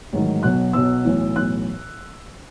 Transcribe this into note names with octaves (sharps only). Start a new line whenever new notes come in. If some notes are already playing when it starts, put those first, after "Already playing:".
A1 G#2 D#3 F#3
B1 B2 F#3 F#6
B1 B2 F#3 E6
B1 A2 E3
B1 A2 E3 F#6